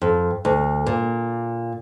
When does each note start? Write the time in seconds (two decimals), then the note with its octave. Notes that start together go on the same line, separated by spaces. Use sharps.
0.02 F2
0.45 D2
0.86 A#2